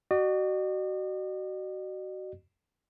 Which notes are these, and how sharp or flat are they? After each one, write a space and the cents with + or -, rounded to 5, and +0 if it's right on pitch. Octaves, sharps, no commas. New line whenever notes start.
F#4 +25 D#5 -45